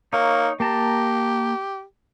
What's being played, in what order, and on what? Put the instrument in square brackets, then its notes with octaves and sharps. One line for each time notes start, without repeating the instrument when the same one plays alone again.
[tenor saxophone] A#3 [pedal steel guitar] D#4 C#5
[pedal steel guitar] A#3 A5 A#5 [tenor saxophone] G4